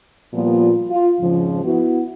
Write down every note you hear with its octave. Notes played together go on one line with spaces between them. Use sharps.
A#2 F3 G3 A#3 B3 F4
F4
F2 G#2 C#3 F3
B3 E4 F#4